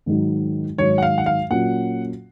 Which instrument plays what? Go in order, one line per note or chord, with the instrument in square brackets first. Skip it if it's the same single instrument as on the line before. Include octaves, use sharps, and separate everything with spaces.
[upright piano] G#2 D#3 F#3
[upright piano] G#2 D#3 F#3 [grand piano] C#5
[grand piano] F#5
F5
F#5
F5
[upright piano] A#2 F#3 C#4 [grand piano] F#5